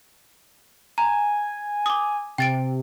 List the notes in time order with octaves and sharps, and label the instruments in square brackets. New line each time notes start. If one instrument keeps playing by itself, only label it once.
[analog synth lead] G#5 [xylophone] A#5
[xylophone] D6 D#6
[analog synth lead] C3 [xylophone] G5 A6 D7